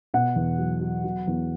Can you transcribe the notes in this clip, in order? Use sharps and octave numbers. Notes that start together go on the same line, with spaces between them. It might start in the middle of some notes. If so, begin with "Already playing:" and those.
B2 F#5
E2
F#3
F#3
F#3
E2